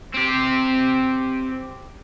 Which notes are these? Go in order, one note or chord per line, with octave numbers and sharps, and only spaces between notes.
C4 G4